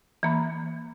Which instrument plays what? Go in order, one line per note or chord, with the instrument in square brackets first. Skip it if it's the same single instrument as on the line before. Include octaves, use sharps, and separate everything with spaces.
[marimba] E3 A#3 B5